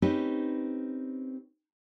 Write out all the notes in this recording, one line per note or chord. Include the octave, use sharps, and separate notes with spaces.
C4 C#4 D#4 G4 B4